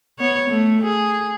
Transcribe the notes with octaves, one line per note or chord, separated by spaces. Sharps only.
B3 C#5
A3
G#4